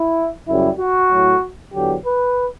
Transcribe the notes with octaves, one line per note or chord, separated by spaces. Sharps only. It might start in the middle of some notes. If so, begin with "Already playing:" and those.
Already playing: E4
F#2 C#3 G3 E4
F#4
A2 F#3 A3
E2 D3 F#3 G4
B4